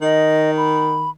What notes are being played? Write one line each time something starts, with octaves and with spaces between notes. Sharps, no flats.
D#3 D#5
B5